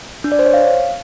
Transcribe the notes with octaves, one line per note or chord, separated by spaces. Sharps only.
D4
D5
C5
C#5
F5